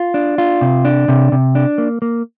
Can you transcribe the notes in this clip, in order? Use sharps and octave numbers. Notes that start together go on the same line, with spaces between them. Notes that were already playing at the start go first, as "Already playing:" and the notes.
Already playing: F4
D4
F4
C3
D4
C3
C3
D4
A#3
A#3